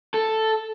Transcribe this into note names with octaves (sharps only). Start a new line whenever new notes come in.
A4